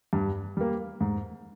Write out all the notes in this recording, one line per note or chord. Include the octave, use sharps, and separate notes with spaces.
G2
G3 A#3
G#2